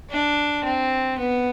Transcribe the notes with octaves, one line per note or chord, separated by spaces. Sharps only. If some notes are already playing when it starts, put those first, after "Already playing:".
D4
C4
B3